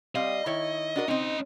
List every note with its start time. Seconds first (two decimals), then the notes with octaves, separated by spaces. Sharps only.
0.15 G3 C4 D#5 F5
0.46 D#3 E4 C#5
0.96 D4 F#4 A#4
1.08 C4 C#4 D#4 D#5